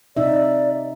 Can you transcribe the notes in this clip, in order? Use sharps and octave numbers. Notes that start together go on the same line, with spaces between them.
C3 D#4 D5 E5